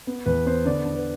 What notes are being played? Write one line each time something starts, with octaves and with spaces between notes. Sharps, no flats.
B3
E2 B4
B3 C5
D3 D5
D3
B4